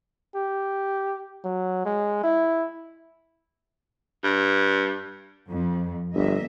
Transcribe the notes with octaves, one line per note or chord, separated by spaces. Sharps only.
G4
F#3
G#3
E4
G2
F2
G1 A#3 D#5 E5